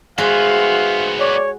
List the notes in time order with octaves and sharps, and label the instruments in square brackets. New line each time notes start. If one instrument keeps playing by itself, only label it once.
[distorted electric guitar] D#3 B3 [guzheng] G#3 F#4 [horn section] C5 E5 F5
[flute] C#5 [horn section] D5